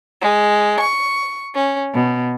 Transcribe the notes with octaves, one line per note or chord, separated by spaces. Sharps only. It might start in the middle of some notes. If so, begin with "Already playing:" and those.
G#3
C#6
C#4
B2